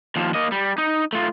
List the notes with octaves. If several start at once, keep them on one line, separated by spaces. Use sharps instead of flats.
D#2 F3
A#3 D#5
G3
D#4
A3 F4